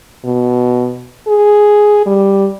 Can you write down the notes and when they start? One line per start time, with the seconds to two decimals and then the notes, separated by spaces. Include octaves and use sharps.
0.25 B2
1.27 G#4
2.06 G3